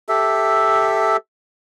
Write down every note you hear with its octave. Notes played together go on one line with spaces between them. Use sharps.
G4 A4 E5